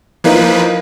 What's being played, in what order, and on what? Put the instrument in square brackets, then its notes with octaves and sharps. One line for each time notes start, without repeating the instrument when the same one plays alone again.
[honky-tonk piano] E3 A#3 D#4 [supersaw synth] F3 B4